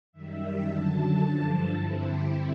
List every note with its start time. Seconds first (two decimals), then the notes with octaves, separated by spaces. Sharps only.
0.12 F#2 D#3 G3 E5
0.66 F#2 D3 F#3 A5
1.19 G2 D3 F3 A5
1.72 G2 D3 G3 C4 E4